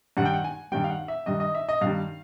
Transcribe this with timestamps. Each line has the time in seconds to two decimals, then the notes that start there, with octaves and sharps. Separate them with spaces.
0.17 G2 D#3 G3 F#5
0.25 G5
0.33 F#5
0.44 G#5
0.72 G2 D#3 G3 G5
0.84 F5
0.90 F#5
1.08 E5
1.26 G2 D#3 G3 D#5
1.40 D#5
1.55 E5
1.69 D#5
1.81 G2 D#3 G3 F5